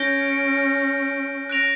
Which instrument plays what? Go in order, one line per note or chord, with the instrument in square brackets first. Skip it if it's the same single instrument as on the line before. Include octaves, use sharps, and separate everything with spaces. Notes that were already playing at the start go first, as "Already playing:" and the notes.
Already playing: [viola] C#4 [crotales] G6 A#6 D7 G7
[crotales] F#6 A#6 D7 F7